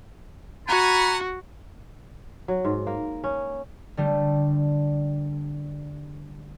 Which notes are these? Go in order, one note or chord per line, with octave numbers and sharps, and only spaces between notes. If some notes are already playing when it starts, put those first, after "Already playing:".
F#4 F#5 G#5 A#5 B5
F#3
G#2
A#3
C#4
D3 G3 A3